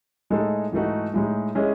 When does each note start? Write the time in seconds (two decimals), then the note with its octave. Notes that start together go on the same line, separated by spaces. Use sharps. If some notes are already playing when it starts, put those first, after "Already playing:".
0.30 A2 G#3 D#4 A4
0.72 G#2 E3 A3 D#4 F#4
1.14 A2 G#3 D#4
1.55 G#3 C#4 E4 G#4 D#5